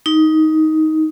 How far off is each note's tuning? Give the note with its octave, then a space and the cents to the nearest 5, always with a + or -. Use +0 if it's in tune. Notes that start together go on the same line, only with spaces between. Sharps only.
D#4 +10